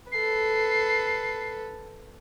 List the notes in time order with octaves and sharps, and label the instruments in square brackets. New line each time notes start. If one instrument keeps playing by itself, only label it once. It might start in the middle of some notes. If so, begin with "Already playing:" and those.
[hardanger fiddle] A4 B4 [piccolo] C7